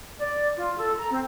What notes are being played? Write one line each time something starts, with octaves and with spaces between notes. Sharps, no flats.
D5
F4
A4
A#5
C4